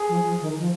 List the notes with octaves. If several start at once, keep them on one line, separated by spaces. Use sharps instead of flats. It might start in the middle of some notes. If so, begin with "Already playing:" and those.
Already playing: G#4
F3
F3
D#3
F3